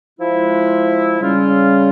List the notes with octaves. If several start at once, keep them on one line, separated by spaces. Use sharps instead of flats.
F3 G#3 E4
C#3 G3 C#4 F4